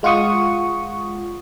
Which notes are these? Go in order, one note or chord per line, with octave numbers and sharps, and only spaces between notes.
G#3 F4 F#5 C#6 D#6